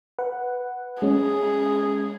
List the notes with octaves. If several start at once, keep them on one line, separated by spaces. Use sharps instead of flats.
B4 F#5
G#3 C#4 G#4